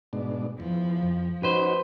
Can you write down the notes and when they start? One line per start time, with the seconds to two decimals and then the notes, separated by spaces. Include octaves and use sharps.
0.13 G#2 B2 D4
0.60 E2 F3
1.03 F2
1.43 C#4 D#4 F#4 B4 C5